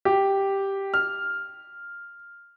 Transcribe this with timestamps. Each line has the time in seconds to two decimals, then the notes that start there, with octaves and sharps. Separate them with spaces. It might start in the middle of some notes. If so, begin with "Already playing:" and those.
0.05 G4
0.94 F6